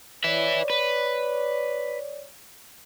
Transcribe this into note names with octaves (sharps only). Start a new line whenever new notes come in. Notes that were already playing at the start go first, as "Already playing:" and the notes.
B4 C#5 D5 E5
B4